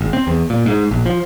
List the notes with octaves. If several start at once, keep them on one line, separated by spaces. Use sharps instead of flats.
G#1
C4
E2
A#2
G#2
A#1
F3